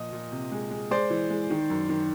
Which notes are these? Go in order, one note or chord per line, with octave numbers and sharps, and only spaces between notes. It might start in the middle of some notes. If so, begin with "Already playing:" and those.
Already playing: A#2 F3 D#5
A#2
C3
G#3
G#3
G#3 C5 D5
E3
G#3
D#3
F#2
D#3